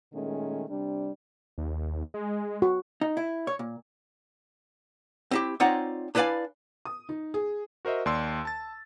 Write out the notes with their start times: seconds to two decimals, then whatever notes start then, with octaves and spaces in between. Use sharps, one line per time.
0.12 A#2 D#3 G#3 A3 C#4
0.69 C3 G3 D4
1.58 D#2
2.14 G#3
2.62 F#4
3.01 D#4
3.17 E4
3.47 C#5
3.59 A#2
5.31 C4 E4 G4
5.60 C4 D#4 F4 C#5 D5 F#5
6.15 D4 E4 B4 D5 F5 G#5
6.85 D#6
7.09 D#4
7.34 G#4
7.85 F#4 A#4 C5 D#5 E5
8.06 D#2 D5 C6 E6
8.45 A5 A6